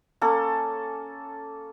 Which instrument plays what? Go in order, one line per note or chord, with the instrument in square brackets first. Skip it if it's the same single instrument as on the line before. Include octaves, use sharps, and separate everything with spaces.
[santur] A#3 C#4 A4